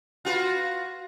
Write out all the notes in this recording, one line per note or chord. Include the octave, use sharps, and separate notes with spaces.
F4 F#4 B4